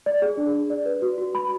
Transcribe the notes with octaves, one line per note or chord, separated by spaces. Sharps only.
D5
G#4
D4
D4
D5
B4
F#4
F#4
B5